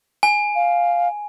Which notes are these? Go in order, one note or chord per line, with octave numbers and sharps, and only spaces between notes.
G#5
F5